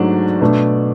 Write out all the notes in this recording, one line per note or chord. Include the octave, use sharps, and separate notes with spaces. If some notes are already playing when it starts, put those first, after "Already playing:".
Already playing: G#2 F#3 A3 D4
B2 A3 D4